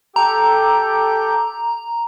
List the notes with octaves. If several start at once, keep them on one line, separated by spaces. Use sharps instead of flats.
G4 A4 G5 A#5